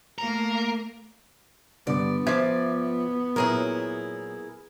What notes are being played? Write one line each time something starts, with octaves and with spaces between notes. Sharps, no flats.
A3 A#3 A#4
G2 D3 B3 D5 D6
F3 D5 E5 G#6
A#2 F#3 E4 G#4 A#4